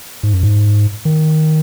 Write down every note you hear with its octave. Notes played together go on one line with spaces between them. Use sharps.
G#2
F#2
G#2
D#3